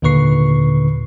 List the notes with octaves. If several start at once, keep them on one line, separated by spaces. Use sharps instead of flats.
D#2 A#2 D3 B4 C#6 C7